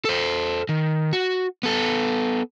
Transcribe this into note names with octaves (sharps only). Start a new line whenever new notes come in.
A4 C5
D#3
F#4
B3 A4